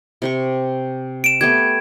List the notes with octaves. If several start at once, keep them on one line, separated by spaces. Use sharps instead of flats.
C3 G4 C#6
D7 E7
A3 B3 G4 G#6